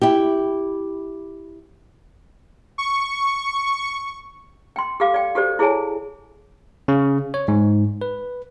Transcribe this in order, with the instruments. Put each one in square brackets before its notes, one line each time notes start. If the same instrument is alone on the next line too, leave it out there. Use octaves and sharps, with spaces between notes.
[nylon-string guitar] E4 G4
[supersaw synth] C#6
[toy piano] G5 C6
G4 A4 F5 D6
D5 G5
F#4 G4 A4 C5 D5
E4 G#4 A4 C#5 G#5 A5
[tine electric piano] C#3
C#5
G#2
B4